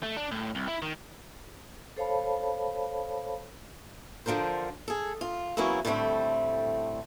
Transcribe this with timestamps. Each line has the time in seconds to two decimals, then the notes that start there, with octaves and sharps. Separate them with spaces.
0.03 A3
0.17 D4
0.31 A2
0.55 C2
0.68 E4
0.82 D#3
1.97 A4 C5 C#5 F5 A5 B5
4.26 D3 F3 D4 A#4 C5
4.88 G#4 A4
5.21 F4
5.57 E2 F#3 A#3 B3 C#4 E4
5.85 A2 D3 G3 A3 C4